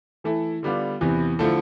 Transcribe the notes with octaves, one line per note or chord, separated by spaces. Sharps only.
E3 A3 E4 A4
D3 G3 B3 D4 F4
E2 C3 E3 B3
D3 F3 A3 E4 A4